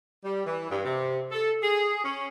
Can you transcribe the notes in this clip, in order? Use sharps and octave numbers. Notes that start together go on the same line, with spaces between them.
G3
E3
G2
C3
A4
G#4
C#4